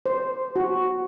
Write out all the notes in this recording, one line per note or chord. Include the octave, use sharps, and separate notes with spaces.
C5
F#4